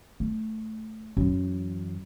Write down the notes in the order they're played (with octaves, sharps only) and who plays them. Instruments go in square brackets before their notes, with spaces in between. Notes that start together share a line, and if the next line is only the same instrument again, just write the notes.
[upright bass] A3
F#2 E3